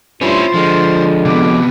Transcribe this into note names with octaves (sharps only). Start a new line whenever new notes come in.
G2 C#4 E4 F4 C5 C6
D3 F3 G#3
C3 B3 D6